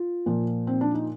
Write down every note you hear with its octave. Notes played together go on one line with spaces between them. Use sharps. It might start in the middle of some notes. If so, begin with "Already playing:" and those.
Already playing: F4
A#2 F3
C4
D4
D#4